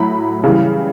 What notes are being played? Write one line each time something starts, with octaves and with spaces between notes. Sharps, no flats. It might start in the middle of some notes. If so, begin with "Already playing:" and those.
Already playing: A2 F#3 B5
C#3 E3 G3